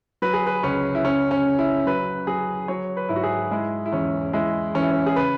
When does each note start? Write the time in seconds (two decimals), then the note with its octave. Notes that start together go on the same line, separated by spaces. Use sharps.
0.22 F#3 B4
0.34 G#4
0.46 B4
0.63 C#2 C#4
0.95 E4
1.04 C#3 C#4
1.31 C#4
1.45 C#3
1.59 E4
1.86 F#3 B4
2.27 F#3 G#4
2.68 F#3 C#5
2.97 B4
3.09 G#2 E4
3.16 F#4
3.23 G#4
3.51 G#3 E4
3.86 E4
3.93 E2 C#4
4.33 G#3 E4
4.75 E3 C#4
4.82 E4
4.91 C#4
5.06 G#4
5.16 C#3 B4